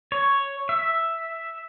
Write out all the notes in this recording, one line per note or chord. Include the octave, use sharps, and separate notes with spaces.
C#5
E5